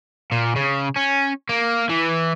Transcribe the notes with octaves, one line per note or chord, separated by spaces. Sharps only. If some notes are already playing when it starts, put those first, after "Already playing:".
A#2
C#3
C#4
A#3
E3